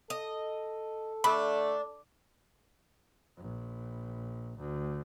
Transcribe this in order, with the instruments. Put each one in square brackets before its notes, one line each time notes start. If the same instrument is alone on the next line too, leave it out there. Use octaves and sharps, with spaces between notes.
[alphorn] A4 [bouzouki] D#5
[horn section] D3 A3 [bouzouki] D4 [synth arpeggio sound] B5
[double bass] A#1
D2